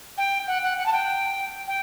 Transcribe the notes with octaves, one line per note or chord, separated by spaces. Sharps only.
G5
F#5
F#5
F#5
A5
G5
G5